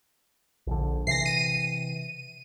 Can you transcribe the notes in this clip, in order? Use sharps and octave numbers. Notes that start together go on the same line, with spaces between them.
A#1 D3
C3 E3 A#6 C7
D#7